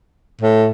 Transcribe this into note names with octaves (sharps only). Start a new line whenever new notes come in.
A2